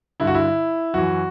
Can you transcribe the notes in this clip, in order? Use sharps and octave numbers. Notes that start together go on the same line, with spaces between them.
G2 D3 E4
F#4
E4
F#2 E3 F#4